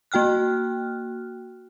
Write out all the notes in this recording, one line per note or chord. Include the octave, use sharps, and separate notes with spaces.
A#3 F#4 G5 F6 F#6